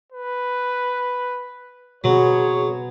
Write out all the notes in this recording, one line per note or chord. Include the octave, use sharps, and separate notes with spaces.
B4
B2 F#3 B3 C4 G#4 C#5